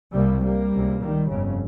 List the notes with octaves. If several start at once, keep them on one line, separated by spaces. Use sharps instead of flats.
C2 C3 G3 A#3
G3 A#3
C#2 C3
D#3 G3
G1 F2 C#3